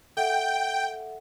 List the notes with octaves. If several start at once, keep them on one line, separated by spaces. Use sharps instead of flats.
A4 E5 F#5 G5